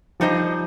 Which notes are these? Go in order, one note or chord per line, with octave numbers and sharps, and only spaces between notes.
F3 G3 D#4 C5 D#5